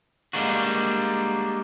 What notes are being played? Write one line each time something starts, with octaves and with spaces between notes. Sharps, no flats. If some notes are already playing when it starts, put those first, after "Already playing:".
G3 G#3 A#3 D4 F#4